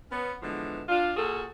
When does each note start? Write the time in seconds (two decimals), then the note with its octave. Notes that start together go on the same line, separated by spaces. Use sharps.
0.11 B3 C#4
0.43 D3 E3 F3 G#3 B3
0.89 D4 F4
1.17 A#2 F#4 G#4 A4